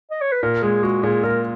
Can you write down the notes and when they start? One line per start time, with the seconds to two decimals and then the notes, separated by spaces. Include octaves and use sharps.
0.11 D#5
0.21 C#5
0.32 B4
0.42 A#2 A#4
0.62 G#3 G#4
0.83 G#3 F#4
1.03 A#2 G#4
1.24 A#2 A#4